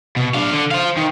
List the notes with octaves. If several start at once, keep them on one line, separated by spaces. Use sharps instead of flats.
B2
D4 F5
D3
C5 F5
D#3